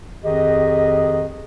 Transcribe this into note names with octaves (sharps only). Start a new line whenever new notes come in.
F2 D#3 G4 G#4 D#5